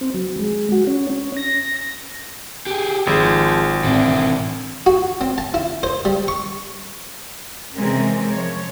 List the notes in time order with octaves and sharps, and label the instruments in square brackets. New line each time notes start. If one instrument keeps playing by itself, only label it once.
[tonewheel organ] C4
F#3
G#3
F#4
C#4
C#4
A#6
[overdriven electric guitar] G4 G#4
[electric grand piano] G#1 [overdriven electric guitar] F3 [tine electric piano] G#4
[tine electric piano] A2 C4 E5 [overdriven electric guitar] E3 D4
[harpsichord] F#4
C4
A5
E4
C5
G3
C#6
[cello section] C3 E3 G#3 C4 C#4 A#4
F3 C#5